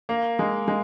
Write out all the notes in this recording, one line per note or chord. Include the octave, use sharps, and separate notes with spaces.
A#3
G#3
G#3